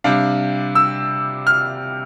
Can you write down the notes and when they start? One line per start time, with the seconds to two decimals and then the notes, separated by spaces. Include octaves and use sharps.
0.04 C3 G3 D4 F5
0.75 E6
1.47 F6